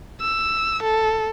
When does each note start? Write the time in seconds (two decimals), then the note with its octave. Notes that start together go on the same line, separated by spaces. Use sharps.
0.21 E6
0.83 A4